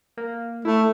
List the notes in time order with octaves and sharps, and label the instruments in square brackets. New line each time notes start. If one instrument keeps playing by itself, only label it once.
[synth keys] A#3
[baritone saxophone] A3 [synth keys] E4